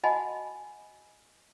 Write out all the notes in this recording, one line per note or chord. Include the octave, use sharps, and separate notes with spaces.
F#4 D#5 F#5 G#5 A5 B5